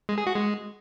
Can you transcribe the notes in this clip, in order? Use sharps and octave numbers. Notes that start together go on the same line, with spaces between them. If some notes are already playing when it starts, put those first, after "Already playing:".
G#3
G#4
F#4
G#3